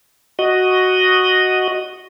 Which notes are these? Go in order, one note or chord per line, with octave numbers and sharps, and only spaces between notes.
F#4 D#5